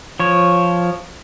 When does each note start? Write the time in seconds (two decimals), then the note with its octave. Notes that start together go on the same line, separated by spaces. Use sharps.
0.20 F3 C#5